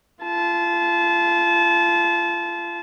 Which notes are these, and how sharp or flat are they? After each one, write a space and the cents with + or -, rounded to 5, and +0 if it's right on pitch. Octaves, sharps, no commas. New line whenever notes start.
F4 -35 A5 -25